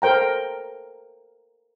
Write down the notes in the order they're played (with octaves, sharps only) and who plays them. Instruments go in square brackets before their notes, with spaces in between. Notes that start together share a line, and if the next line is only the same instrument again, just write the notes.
[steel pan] A4 A#4 C5 G5 A#5